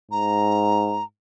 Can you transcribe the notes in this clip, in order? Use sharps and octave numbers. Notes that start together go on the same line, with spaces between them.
G#2 A#5